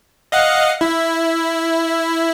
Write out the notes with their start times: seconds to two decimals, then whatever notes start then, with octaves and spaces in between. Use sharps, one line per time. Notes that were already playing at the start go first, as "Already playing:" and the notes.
0.32 D#5 F5 F#5
0.81 E4